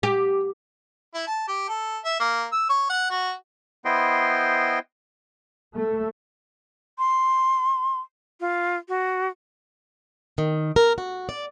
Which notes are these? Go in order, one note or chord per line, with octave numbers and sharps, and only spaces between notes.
G4
E4
A5
G4
A4
E5
A#3
E6
C#5
F#5
F#4
B3 E4 C5 D#5 G5 C6
A3
C6
F4
F#4
D#3
A#4
F#4
D5